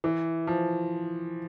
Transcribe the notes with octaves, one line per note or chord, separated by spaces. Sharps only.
E3
F3